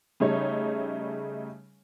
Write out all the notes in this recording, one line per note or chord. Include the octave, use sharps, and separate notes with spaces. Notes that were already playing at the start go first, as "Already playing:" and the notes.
C#3 G3 A3 D#4 C#5